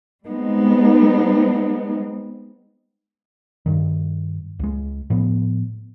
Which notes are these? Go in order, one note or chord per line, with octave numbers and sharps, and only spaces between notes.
G3 G#3 B3 C4 D#4
G2 D#3
C#2 G#3
A2 F3 B3